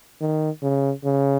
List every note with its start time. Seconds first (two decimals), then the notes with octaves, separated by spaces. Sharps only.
0.21 D#3
0.63 C#3
1.04 C#3